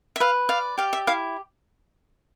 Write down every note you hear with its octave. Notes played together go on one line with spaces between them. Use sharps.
E5
B4 F5
D5 F5
G4 F5
E5
E4 F5